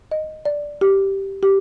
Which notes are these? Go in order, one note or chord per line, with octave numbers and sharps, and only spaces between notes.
D#5
D5
G4
G4